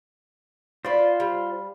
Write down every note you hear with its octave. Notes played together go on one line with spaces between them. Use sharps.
F4 B4 C5 D5
G3